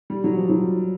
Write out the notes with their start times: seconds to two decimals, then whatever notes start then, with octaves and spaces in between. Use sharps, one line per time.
0.10 G3
0.24 F#3
0.37 F3
0.49 F#3